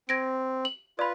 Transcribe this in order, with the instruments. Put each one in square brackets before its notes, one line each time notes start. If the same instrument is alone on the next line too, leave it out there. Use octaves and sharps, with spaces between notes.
[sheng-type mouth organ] C4 [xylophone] G#6 A#6 D7
[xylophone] F#7
[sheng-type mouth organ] F4 B4 [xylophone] D5 B5